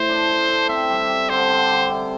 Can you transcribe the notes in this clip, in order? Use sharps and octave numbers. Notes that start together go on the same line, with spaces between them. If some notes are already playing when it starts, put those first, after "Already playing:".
Already playing: A2 C5
D4
A4
A4
C4 E5
G3
G4
D3 C5
D3
D3
C3